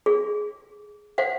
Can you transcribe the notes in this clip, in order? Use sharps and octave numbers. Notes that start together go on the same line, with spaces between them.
G#4
C5 F5 F#5